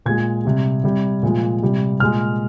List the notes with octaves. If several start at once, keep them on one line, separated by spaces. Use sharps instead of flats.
A#2 G#3 G#6
C3 G3
C3 G3
A#2 F3 G#3
C3 G3
A#2 G#3 F6